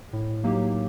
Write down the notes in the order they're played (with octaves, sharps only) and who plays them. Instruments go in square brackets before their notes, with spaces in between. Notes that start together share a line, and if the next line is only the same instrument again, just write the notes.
[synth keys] A2
F#3 A#3 D#4 G4